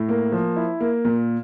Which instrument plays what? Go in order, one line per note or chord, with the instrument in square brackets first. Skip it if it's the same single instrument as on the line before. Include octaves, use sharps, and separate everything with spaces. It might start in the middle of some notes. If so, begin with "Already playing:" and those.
Already playing: [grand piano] A2
A#3
F3
E4
A#3
A#2